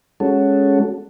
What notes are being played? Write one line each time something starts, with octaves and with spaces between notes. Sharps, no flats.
G#3 C#4 F#4 A4